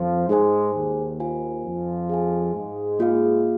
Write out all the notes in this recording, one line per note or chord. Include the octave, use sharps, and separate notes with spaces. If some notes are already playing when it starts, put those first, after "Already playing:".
Already playing: F2 F3
G#2 G#3 D#4 G#4 C5 G#5
D#2 D#3
F4 C5 F5 G#5
F2 F3
G#4 F5 G#5
G#2 G#3
A#3 F4 G#4 F5